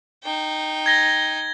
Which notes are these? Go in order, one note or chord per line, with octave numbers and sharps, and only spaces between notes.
D#4 G5
G#6 A#6 G7